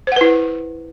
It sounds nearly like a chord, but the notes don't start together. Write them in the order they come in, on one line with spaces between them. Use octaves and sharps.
C5 F#5 B4 E4